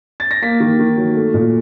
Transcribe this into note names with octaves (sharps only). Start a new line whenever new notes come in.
A6
A#6
A#3 B6
D#3
D#3
F#3
A3
A#2